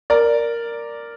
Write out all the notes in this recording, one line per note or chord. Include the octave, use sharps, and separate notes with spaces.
A#4 D5